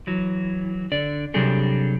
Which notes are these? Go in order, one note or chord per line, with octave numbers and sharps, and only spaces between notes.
E3 F#3
D3 D5
C3 F#3 G3 D4 G#4 A4